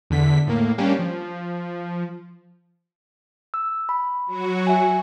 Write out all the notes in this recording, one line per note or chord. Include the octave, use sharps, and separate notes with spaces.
E2 D3 B6
A2 A#3
G3 A#3 C#4 D4 G4
F3
E6
B5
F#3 F#4
E5 G#5